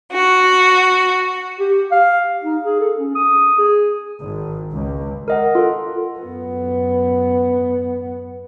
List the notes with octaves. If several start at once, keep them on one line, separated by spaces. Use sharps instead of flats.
F#4
G4
F5
D#4
G#4
A4
C#4
D#6
G#4
G#1
C#2
A#4 D#5 F#5
F4 A4
F#2 B3